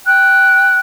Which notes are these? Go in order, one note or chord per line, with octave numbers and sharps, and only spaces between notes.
G5 F#6